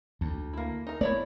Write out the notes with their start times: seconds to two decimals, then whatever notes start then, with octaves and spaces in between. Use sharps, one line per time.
0.21 D2
0.53 A#3 E4
0.87 D#4 A#4
1.01 A3 B3 E4 C#5 D5